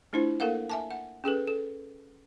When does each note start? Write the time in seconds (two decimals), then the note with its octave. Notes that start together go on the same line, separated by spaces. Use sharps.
0.13 A3 D4 E4 F4 C5
0.40 A#3 A4 A#4 F5 F#5
0.69 E5 G#5 A5
0.91 F#5
1.24 C#4 G#4 A4 B4
1.47 A4